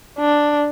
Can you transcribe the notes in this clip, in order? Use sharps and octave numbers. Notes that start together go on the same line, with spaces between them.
D4